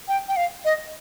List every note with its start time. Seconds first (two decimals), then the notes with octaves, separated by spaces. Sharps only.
0.08 G5
0.28 G5
0.36 F5
0.65 D#5